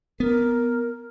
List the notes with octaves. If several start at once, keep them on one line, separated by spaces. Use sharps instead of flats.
B3 A#4